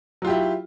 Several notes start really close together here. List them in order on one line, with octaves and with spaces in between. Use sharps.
F#3 F4 G4 E4